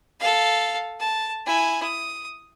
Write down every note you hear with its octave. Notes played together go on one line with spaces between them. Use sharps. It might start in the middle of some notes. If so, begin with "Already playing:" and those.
A4 F5
A5
E4 G#5
D#6